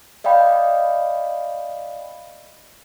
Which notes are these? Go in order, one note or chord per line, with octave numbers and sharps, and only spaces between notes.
D5 D#5 F5 G5 B5